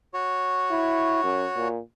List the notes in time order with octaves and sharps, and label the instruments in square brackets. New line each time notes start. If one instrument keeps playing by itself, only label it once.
[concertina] F#4 C#5
[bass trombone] E4
F#2
A#2